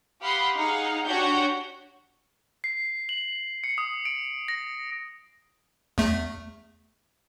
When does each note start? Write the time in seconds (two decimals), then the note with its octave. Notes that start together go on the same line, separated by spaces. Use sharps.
0.21 G4 F5 F#5 B5 C6 D#6
0.55 D#4 G#4 F5 F#5
1.05 D4 F#4 G4 C#5 F#5 G6
2.64 C7
3.09 F#7
3.64 C#7
3.78 D#6
4.05 D7
4.48 A#6
5.98 E2 A3